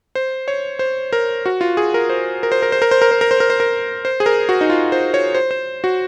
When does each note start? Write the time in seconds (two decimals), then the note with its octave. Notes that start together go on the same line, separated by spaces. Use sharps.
0.15 C5
0.48 C#5
0.79 C5
1.13 A#4
1.46 F#4
1.61 F4
1.77 G#4
1.94 A#4
2.10 C5
2.43 A#4
2.52 C5
2.62 A#4
2.72 C5
2.82 A#4
2.91 C5
3.02 A#4
3.11 C5
3.21 A#4
3.31 C5
3.40 A#4
3.50 C5
3.60 A#4
4.05 C5
4.20 G#4
4.26 A#4
4.49 F#4
4.61 D#4
4.70 F4
4.92 C5
5.14 C#5
5.35 C5
5.51 C5
5.84 F#4